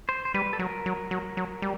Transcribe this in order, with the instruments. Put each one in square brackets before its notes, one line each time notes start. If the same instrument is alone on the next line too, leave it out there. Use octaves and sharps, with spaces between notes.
[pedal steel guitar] C5
C5
[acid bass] G3 [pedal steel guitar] B4
[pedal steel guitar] A4
[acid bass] F#3 [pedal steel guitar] A#4
[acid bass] F#3
F#3
F#3
G3